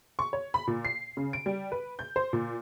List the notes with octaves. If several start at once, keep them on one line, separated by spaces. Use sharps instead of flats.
C#6
C#5
B5
A#2
C7
C#3
D7
G3
B4
G6
C5
A#2